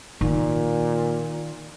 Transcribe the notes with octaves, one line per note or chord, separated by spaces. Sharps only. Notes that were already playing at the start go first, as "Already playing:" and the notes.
A#2 D#3